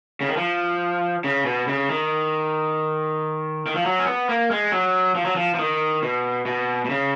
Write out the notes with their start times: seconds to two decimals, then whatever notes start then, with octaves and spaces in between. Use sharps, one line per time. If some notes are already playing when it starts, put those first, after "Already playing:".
0.21 C#3
0.28 D#3
0.37 F3
1.24 C#3
1.45 B2
1.68 C#3
1.89 D#3
3.66 D#3
3.76 F3
3.86 F#3
4.00 C#4
4.07 B3
4.29 A#3
4.51 G#3
4.72 F#3
5.15 F3
5.25 F#3
5.36 F3
5.54 F3
5.59 D#3
6.02 B2
6.46 B2
6.85 B2
6.90 C#3